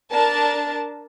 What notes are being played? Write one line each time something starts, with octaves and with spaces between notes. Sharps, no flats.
D4 A#4 A5